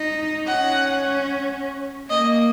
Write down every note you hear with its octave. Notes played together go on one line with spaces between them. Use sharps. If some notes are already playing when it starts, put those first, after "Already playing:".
Already playing: D#4
C#4 F#5
A#3 D#5